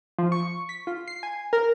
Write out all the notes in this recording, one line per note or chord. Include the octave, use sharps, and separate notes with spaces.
F3
C#6
B6
F4
C7
G#5
A#4